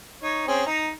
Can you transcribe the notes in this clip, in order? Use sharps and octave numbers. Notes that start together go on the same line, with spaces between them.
D#4 C#5
C4 C#4 G#4
D#4 A#5